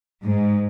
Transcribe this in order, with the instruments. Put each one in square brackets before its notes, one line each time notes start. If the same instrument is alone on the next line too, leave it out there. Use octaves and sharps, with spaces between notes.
[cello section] G#2